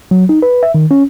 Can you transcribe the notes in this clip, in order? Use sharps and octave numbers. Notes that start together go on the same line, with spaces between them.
F#3
D#4
B4
E5
D#3
C#4